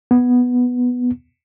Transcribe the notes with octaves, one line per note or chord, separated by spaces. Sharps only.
B3